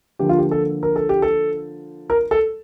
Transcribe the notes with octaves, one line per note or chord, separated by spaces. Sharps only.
D3 F3 A#3 G4
F4
G4
A4
A#4
A4
G4
A4
A#4
A4